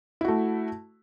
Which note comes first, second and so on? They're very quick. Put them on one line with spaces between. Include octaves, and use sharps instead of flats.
E4 F#4 A3